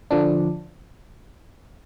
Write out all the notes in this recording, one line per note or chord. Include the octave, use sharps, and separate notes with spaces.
D3 F3 D4